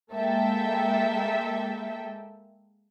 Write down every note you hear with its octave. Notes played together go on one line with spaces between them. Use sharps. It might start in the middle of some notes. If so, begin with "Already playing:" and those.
G#3 A#3 A4 E5 G5